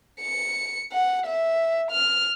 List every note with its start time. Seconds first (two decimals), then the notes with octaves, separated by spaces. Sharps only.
0.21 C#7
0.92 F#5
1.26 E5
1.91 F6